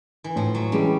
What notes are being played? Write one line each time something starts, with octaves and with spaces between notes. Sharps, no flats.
E3
A2 F3
F#3
E3 G3 G#3 C#4